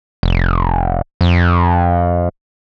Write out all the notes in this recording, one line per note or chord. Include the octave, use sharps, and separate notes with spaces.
F1
F2